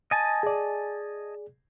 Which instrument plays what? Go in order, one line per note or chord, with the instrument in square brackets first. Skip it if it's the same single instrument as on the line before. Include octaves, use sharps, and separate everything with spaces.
[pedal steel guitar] D#5 G#5 A5
[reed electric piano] G#4 D5